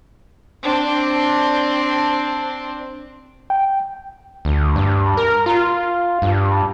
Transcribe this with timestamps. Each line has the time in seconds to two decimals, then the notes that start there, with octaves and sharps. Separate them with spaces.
0.63 C4 D4
3.50 G5
4.45 D2
4.76 G2
5.17 A#4
5.46 F4
6.22 G2